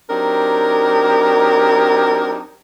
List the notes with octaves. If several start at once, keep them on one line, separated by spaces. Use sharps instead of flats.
F#3 C4 D4 D#4 G4 A#4